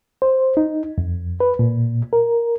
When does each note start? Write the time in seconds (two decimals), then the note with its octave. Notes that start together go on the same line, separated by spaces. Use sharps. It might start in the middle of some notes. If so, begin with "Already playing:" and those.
0.22 C5
0.57 D#4
0.98 F2
1.40 B4
1.59 A#2
2.13 A#4